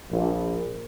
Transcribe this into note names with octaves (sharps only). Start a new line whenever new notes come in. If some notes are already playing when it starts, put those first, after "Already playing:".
A#1